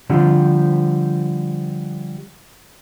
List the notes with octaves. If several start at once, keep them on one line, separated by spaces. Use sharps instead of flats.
D3 F3 G3 C4